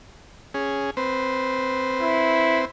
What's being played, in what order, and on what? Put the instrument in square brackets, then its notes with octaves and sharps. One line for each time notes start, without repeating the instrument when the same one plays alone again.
[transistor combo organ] C#4 G#4
C4 B4 C5
[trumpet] E4